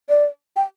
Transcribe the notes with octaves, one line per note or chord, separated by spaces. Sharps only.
D5
G5